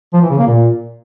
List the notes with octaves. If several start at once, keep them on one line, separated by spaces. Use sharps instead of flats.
F3
E3
C#3
A#3
A#2